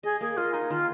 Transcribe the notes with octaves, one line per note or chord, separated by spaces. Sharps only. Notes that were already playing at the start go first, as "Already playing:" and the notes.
G#4 D#5
A#3 G#4
F4 D#5
D#4 D#5
D#3 F4